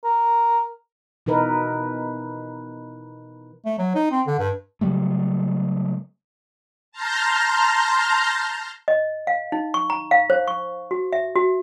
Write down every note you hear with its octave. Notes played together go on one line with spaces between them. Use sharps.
A#4
B2 E3 D#4 A#4 B4
A3
F#3
D#4
C4
D3
G2
C#3 F#3 G3 A3
A5 A#5 C6 F6 G6 A#6
D#5
F5
D#4
C#6
A#5
F5
C5
C#6
F#4
E5
F#4